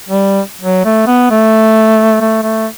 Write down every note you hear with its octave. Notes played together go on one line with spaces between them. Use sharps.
G3
F#3
A3
B3
A3
A3
A3